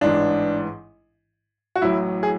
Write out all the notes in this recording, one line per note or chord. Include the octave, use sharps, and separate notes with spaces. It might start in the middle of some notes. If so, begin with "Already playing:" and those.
A1 G#2 E3 D4
F#4
A1 A2 F#3 E4
G#4